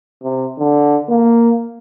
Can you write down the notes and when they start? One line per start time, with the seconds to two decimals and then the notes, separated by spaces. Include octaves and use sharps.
0.23 C3
0.59 D3
1.09 A#3